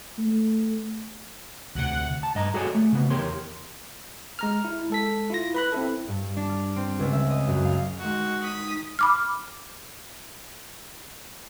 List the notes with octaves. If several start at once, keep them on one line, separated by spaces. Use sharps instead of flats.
A3
D2 C3 F#5
A5
G2 D#5 A#5
F#4 G#4 A4 C#5 D5 G#5
A3
C#3 B3
E2 G4 A#4 C#5 C6
G#3 A#5 F6
E4
G#3 A4 B6
E4 F4 A#6
B4 B5 F#6
C4 E4 A4
G2
D4
F6
C4
C#2
E5
D#5
F#2
F5
D#3 G#3 F#4
D#4 D#6 B6
B5 D6 F6